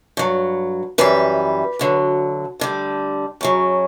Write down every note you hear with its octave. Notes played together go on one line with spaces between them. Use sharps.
G2 F#3
F#2 E3 G3 B4
D2 D3 F#3
D2 D3 G3
F#2 C#3 F#3